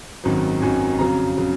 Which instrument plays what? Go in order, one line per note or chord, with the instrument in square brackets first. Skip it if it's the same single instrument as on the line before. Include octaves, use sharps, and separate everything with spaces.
[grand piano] G#1 F#2 D#3 F#3
G#1 F#2 D#3 F#3 G#5
F2 C#3 F#3 A#5
C#3 F#3